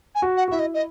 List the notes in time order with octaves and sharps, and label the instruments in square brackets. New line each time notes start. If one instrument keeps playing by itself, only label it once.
[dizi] G#5
[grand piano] F#4
[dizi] F#5
[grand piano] F#4
[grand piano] E4 [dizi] E5
[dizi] D#5
D#5